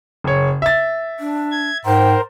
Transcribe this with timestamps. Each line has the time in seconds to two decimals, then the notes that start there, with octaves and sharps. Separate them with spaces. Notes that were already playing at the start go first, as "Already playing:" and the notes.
0.24 F#1 C#5
0.62 E5 A6
1.20 D4
1.51 G#6
1.85 G#2 A#4 C5 G5